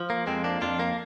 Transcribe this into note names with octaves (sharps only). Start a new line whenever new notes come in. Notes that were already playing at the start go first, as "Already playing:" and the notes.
Already playing: F3
A#3
F2 G#3 C4
A#3 D4
F2 D4 F4
A#3